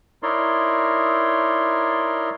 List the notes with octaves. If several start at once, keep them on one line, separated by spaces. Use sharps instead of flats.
D#4 E4 A#4 C#5 D5 C6